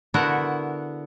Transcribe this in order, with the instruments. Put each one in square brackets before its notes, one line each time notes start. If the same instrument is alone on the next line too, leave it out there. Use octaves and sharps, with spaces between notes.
[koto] D3 B3 E4 F#4 A#4 F#5